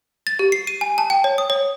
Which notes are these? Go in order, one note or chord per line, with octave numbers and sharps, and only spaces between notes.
A6
G4
C7
D#7
G#5
A5
G5
C#5
D#6
C#5